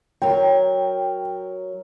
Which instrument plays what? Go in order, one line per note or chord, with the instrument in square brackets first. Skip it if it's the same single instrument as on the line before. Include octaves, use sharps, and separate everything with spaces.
[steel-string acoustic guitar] F#3 A#4 [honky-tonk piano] G5